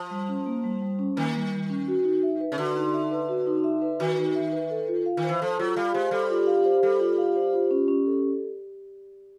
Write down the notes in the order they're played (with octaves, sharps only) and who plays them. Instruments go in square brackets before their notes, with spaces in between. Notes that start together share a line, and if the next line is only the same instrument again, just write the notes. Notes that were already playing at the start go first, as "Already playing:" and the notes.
Already playing: [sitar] F3
[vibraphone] G3
C#4
A#3
G3
G3
C#4
[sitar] D#3 [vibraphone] A#3
[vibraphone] G3
G3
C#4
F#4
D#4
E5
B4
[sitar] C#3
[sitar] D3 [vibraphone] F#4
[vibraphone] D#4
E5
B4
F#4
D#4
E5
B4
[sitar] D#3 [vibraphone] F#4
[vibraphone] D#4
E5
B4
A4
F4
F5
[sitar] D#3
[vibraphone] C5
[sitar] E3
[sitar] F3 [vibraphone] A4
[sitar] F#3 [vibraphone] F4
[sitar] G3 [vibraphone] F5
[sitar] G#3 [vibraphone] C5
[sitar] G3 [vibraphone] A4
[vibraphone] F4
F5
C5
[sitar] G3 [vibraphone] A4
[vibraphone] F4
F5
C5
F4
C#4
C#4
A4